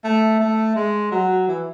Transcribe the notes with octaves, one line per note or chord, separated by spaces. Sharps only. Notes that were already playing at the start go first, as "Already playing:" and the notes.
A3
A3
G#3
F#3
E3